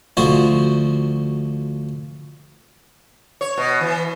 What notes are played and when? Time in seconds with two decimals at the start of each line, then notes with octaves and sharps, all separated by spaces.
0.17 D2 F3 F#4 C5
3.41 C#5
3.57 B2
3.81 E3